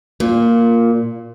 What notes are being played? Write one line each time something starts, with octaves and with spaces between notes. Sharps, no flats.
A#2